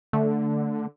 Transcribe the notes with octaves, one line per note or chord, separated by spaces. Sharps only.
D3 A3